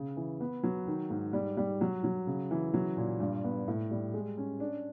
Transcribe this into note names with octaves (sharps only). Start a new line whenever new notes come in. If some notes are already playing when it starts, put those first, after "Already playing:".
Already playing: C#3
E3
B3
F#3
D#3
G#2
G3
G3
F#3
F#3
C#3
E3
F#3
A#2
G2
B3
A2
G3
G#3
C#4
D4